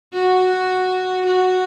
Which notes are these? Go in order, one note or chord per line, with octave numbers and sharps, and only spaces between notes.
F#4
F#4